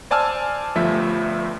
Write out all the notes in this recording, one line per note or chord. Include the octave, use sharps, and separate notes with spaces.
C5 D5 G#5 A5 E6 F6
G1 G2 F3 A3 E5